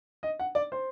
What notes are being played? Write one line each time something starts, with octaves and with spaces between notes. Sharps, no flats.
D#5
F#5
D5
C5